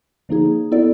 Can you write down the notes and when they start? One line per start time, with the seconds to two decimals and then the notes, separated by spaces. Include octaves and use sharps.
0.29 D3 F3 A#3 D#4 G#4
0.72 B3 E4 A4 D5